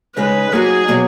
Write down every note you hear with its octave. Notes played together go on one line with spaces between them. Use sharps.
C#3 G#3 D#4 G#4 B4
F#3 A#3 D#4 F#4 G#4
B2 F#3 A#3